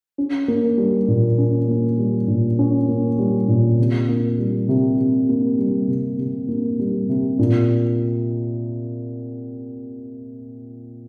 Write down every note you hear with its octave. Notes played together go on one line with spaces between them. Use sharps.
C#4
A#3
G3
A#2
C#4
A#3
G3
A#2
C#4
A#3
G3
A#2
C3
A#3
G3
C3
C3
A#3
G3
C3
C3
A#3
G3
C3
A#2